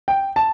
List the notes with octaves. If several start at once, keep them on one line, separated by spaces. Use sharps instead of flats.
G5
A5